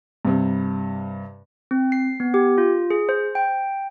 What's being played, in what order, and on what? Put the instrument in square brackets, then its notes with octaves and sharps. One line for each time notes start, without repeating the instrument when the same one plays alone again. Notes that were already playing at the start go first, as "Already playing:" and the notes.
[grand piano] G2 C3
[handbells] C4
C7
B3
G4
F4
G#4
C5
G5